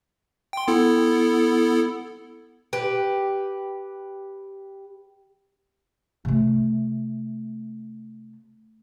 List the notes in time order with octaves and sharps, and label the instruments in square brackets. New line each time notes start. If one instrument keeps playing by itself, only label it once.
[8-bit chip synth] G5 C6
B3 E4 A4
[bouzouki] G4 B4
[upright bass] C3 A3